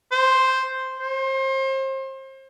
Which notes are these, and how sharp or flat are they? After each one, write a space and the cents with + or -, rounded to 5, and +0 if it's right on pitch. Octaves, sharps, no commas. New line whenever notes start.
C5 +0
C5 +35